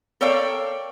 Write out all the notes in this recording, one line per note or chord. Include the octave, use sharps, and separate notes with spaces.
A4 A#4 C#5 D5 F5 G5